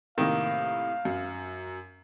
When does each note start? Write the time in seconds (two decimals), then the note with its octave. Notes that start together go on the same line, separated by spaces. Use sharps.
0.18 A2 C3 D#3 A#3 F5
1.05 F#2